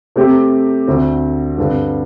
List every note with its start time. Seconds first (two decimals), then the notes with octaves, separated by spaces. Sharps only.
0.16 C3 A3 C4 G4
0.87 D2 D3 C4
1.58 G2 D3 C4